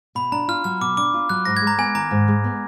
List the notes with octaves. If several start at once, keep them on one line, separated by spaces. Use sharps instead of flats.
B2 B5
D4 A#5
F4 F6
F#3 F6
B2 D6
D4 D6
F4
F#3 F#6
G#2 A#6
G#6
G#3
A#5
B3 G#5
D#3 A#5
G#2
G#3
B3